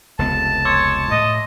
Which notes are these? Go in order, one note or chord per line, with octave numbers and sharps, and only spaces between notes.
F1 C#2 B3 A5
C#5 C6 D6 E6
A2 D#5